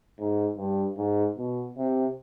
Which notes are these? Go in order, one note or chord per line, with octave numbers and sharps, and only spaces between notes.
G#2
G2
G#2
B2
C3